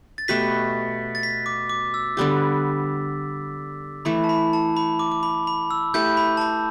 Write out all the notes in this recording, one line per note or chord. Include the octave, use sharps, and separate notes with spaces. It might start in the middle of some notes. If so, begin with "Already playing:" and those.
A6
B2 A3 G4 B4 B6
A6
B6
D6
D6
E6
D3 G3 B3 G4 D6
E3 A3 E4 B5
A5
B5
A5
B5
D6
D6
B5
B5
E6
A3 E4 G4 B4 G6
B5
A5
B5